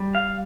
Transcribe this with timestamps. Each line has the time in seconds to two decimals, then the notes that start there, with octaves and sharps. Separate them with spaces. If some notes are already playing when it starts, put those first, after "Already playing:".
Already playing: G3
0.15 F5